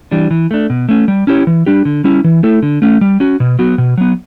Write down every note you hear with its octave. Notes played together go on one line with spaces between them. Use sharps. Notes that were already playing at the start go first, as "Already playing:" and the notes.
E3 G3 D4
E3
A3 D4
B2
A3 C#4
G3
C#4 E4 G4 C#5
E3
G3 D4 G4
D3
G3 C#4 E4
E3
A3 E4 A4
D3
A3 C#4
G3
C#4 F#4
B2
F#3 B3 F#4
B2
F#3 B3